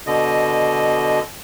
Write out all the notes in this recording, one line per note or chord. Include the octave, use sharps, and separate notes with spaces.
B2 D3 D#5